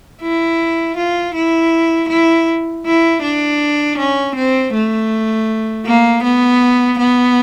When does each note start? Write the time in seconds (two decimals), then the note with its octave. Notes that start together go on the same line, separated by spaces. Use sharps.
0.22 E4
0.97 F4
1.34 E4
2.09 E4
2.85 E4
3.22 D4
3.98 C#4
4.35 C4
4.73 A3
5.86 A#3
6.23 B3
6.99 B3